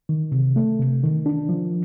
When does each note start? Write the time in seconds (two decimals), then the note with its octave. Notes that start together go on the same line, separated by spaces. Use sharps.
0.09 D#3
0.32 C3
0.56 A3
0.79 C3
1.03 D#3
1.26 D4
1.49 F3